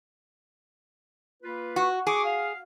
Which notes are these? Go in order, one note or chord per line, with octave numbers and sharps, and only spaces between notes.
A#3 F4 B4
F#4
G#4 C#6 D6
F5